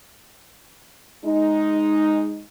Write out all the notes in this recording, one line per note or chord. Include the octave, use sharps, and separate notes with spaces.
G#3 D#4